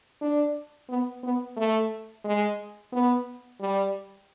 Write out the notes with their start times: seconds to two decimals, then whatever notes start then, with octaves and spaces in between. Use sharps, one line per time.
0.21 D4
0.89 B3
1.23 B3
1.56 A3
2.24 G#3
2.93 B3
3.60 G3